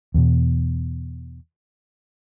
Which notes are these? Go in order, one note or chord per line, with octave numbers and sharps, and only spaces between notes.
E2 B2